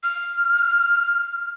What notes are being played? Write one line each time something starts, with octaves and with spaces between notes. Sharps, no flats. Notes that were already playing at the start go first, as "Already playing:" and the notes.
F6